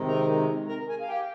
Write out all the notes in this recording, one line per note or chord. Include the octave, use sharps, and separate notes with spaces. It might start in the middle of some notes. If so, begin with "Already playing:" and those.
Already playing: C3 D#3 G#3 C4 D#4
A#4 A#5
A#4 A#5
G#4 G#5
F5
G4 G5